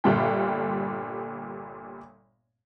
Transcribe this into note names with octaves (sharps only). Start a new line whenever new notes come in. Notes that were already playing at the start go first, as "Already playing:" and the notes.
G1 A#2 D3 G3 F4 G5